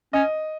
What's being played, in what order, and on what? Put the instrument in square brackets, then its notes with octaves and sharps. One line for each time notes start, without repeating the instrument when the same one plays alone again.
[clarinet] C#4 [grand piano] D#5